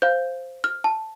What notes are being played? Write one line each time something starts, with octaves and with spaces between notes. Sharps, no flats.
C5 F5 G6
F6
A5